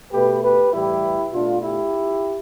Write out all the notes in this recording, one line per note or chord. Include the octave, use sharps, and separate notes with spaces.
B2 A3 G4 B4
G4 B4
A2 E3 G3 E4 G4
B2 A3 D4 F4
E4 G4